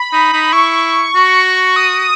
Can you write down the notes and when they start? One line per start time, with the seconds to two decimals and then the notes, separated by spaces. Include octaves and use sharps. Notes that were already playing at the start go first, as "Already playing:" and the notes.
Already playing: B5
0.12 D#4
0.33 D#4
0.53 E4 C#6
1.15 F#4
1.76 D#6